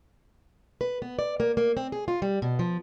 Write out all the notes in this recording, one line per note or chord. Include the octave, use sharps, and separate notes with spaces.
B4
B3
D5
A#3
A#3
C4
G#4
F4
G3
B2
F3